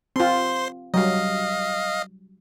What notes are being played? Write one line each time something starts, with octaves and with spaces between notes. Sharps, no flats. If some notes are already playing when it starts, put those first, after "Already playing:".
C4 F4 C5 C6
F#3 G3 D#5 F5